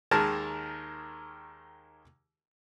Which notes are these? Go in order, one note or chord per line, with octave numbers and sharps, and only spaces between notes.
D#2 D#3 G#3 A#4 A5